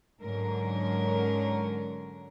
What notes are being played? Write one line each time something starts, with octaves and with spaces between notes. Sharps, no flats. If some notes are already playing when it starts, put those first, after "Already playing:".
G#2 D3 F#3 C#4 A#4